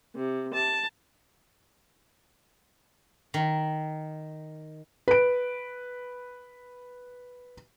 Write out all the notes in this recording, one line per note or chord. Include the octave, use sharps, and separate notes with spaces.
C3
A5
D#3
B4 D7